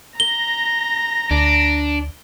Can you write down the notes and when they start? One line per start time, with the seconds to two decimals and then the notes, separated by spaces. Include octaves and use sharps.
0.20 A#5 A#6 G7
1.31 D2 D4